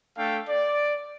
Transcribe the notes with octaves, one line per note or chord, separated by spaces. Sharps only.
A3 D4 A4 F5 G5
D5